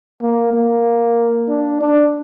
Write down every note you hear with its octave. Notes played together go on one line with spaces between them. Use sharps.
A#3
A#3
D4
D4